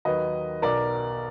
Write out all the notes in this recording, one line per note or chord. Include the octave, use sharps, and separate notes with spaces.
D#2 D#3 F#3 B4 D#5
B1 B2 F#3 A#4 D5